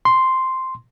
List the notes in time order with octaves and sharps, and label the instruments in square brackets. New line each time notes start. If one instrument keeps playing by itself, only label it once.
[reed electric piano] C6